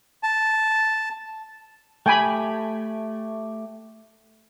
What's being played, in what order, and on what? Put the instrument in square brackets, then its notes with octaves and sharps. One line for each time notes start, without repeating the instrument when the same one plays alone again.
[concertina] A5
[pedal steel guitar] A3 G4 [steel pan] G5 G#5 B5